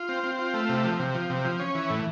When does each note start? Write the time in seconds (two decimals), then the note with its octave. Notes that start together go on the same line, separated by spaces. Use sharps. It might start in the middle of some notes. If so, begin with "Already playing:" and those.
Already playing: F4
0.09 C4
0.24 C4
0.39 F4
0.54 A3
0.69 C3
0.84 F3
0.99 C3
1.14 F3
1.30 C3
1.45 F3
1.60 C#4
1.75 E3
1.90 A2